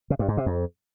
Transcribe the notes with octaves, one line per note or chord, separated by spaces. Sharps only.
C#3
G2
G#2
C3
F2